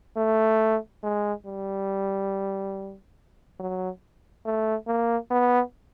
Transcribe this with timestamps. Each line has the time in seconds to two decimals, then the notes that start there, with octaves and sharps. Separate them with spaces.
0.17 A3
1.03 G#3
1.46 G3
3.60 F#3
4.46 A3
4.87 A#3
5.30 B3